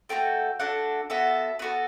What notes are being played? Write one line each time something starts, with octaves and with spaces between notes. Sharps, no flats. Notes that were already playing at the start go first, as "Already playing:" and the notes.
A3 D4 F#4 A4 G5
A3 D4 F#4 A4 F#5
B3 F#4 A4 E5
B3 F#4 A4 B4